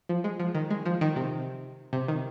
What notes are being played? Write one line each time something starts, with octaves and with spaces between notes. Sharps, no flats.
F3
G#3
F3
D#3
G#3
F3
D#3
C3
C3
D#3